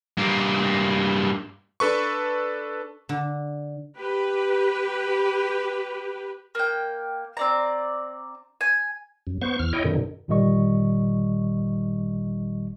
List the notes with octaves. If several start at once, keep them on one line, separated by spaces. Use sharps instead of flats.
G2 A#3
D4 A4 B4 C#6
D3
G4 B4
A#3 G5
C4 D5 A#5
G#5
F#2
B3 C5 C#6
E2 F6
E4 C#5 D#5 G5
F#2 B2 D3 D#3
G1 A#2 D#3 G3 D#5 C#6